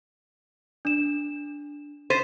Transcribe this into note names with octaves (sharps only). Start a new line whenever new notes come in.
D4 E7
C5 A6 B6 D#7